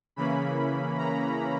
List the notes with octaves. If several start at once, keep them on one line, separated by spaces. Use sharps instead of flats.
C#3 E3 A#3 C#4 B5
A#5